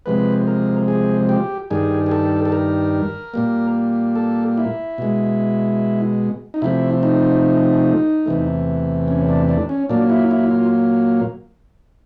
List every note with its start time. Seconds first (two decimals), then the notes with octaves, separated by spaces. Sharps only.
0.06 C3 F3 G#3 B4
0.47 A#4
0.88 G#4
1.29 G4
1.70 G2 D#3 G3 G#4
2.06 G#4
2.11 A4
2.45 A4
2.52 A#4
3.34 A#2 G3 A#3
4.15 A4
4.58 E4
4.98 B2 G#3
6.54 D#4
6.62 C3 F3 A3 E4
7.03 D#4
8.26 E2 C3 E3 A3
9.08 C#4
9.29 D4
9.49 D4
9.69 C#4
9.89 A#2 F#3 A#3 D4
10.10 E4
10.31 E4
10.51 F4